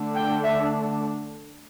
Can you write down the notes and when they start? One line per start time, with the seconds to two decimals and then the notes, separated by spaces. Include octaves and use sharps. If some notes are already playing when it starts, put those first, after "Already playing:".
Already playing: D3 A3 D4
0.15 G5
0.44 E5